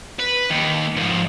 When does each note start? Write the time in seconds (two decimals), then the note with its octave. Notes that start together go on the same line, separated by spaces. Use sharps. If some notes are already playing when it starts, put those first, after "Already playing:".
0.19 B4
0.50 D#2 D#3
0.96 G#2 F3